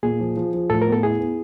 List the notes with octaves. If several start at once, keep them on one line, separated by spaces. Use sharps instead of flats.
A#2 G#4
F3
F3
F3
A2 A4
A#4
B3
A4
E4 G#4
B3